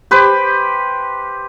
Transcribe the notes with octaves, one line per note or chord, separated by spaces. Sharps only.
G4 B4 C5